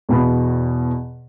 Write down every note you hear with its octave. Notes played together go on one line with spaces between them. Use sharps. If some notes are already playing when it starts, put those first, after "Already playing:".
E2 B2 B5